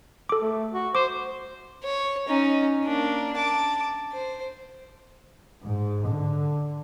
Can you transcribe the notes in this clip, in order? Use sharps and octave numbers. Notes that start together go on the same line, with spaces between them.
A4 D6
A3
F#4
C5 D6
C#5
C#4 D#4
A#3 D4
A5 D6
C5
G#2
D3